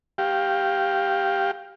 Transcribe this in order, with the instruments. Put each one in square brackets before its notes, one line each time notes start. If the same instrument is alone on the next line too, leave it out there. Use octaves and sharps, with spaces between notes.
[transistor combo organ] G4 F5 G5